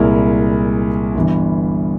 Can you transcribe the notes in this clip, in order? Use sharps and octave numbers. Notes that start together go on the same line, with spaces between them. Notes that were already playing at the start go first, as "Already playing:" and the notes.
Already playing: C2 A#2 G#3 E4 A#4
G1 G2 E3